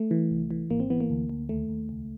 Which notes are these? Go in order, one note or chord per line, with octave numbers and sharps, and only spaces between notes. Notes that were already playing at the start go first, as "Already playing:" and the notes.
Already playing: A3
E3
C2
E3
G#1 A#3
C4
E3 B3
A#3
D2
D2
D#2 A3
D#2
C#2